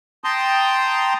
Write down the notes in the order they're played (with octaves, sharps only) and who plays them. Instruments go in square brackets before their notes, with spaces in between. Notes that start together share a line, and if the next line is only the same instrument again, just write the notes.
[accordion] G5 A5 A#5 C6 D#6